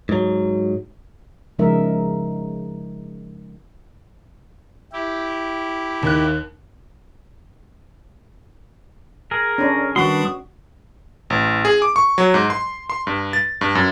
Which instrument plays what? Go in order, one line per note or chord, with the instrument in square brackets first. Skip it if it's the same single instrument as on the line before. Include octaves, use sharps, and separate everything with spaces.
[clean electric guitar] G#2 F#3
[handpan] C#3 F3 G#3 D#4 A#4 E5
[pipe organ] E4 G4
[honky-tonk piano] D#2 F#6 [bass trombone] D#3
[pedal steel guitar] G#4 A#4
[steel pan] C#4 D4
[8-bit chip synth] D#3 G3 D#6 [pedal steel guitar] D4 B4 C6 [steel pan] F#4
[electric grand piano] A1
G#4
D6
C#6
F#3
G#2
C6
C6
G2
A6
G2
F#2